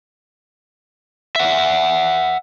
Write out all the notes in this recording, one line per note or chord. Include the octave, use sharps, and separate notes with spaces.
E5 F#5